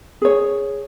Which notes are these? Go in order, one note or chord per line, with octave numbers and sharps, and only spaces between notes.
G#4 C#5